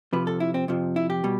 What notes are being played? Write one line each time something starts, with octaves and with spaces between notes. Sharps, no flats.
F2 C3 F3 B4
A4
E4
C4
F2 C3 F3
E4
G4
B2 G3